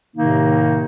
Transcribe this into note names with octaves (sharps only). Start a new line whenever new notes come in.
A2 C3 D#3 A#3 D#4